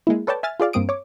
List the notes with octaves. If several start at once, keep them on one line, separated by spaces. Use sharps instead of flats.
G#3 A#3 E4
A4 B4 C#5 D5 G5 A5
E5 G#5 F6 A6
F4 G#4 D5 F5
G2 A#3 C4 D#6 D7
C#5 D6